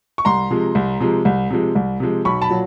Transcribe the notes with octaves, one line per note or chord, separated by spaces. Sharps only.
C#6
C2 A#5 C6
C3 F3 G#3
C2
C3 F3 G#3
C2
C3 F3 G#3
C2
C3 F3 G#3
B1 B5 C#6
A5 B5
A#2 F#3